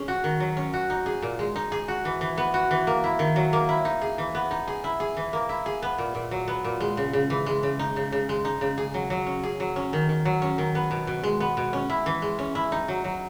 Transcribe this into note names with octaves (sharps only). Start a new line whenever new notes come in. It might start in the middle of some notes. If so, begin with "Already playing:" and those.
Already playing: C#4 G#4
F#4
D#3
F#3
C#4
F#4
D#4
G#4
A#2
G#3
D#4
G#4
F#4
E3
E3
B3
F#4
E3
A#3
E4
D#3
F#3
A#3
E4
D#4
G#4
E3
B3
D#4
G#4
E4
G#4
E3
A#3
E4
G#4
B3
A#2
A#2
F#3
B3
A#2
G#3
C#3
C#3
E3
G#3
C#3
D#4
C#3
C#3
G#3
D#4
C#3
G#4
F#3
F#3
C#4
G#4
F#3
C#4
D#3
D#3
F#3
C#4
D#3
B3
B2
B2
G#3
B3
B2
C#4
E4
E3
G#3
C#4
E4
D#4
F#3
F#3